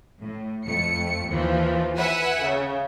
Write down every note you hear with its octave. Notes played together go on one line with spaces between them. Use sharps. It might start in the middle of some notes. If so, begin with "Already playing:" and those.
A2
F2 A3 C#7
D#2 E3 F3
B4 E5 F#5 G#5
C#3